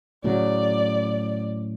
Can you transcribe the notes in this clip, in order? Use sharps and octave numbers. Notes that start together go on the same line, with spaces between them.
A2 C#3 F#3 D5